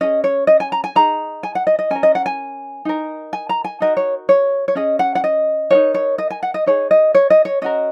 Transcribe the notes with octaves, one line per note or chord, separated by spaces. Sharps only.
C#4 G#4 D#5
C#5
D#5
G#5
A#5
G#5
D#4 G#4 A#5
G#5
F#5
D#5
D#5
C#4 A#4 G#5
D#5
F#5
G#5
D#4 A#4
G#5
A#5
G#5
D#4 F#4 A#4 D#5
C#5
C#5
C#5
C#4 G#4 D#5
F#5
F#5
D#5
D#4 F#4 A#4 C#5
C#5
D#5
G#5
F#5
D#5
D#4 G#4 C#5
D#5
C#5
D#5
C#5
C#4 F#4 A#4 D#5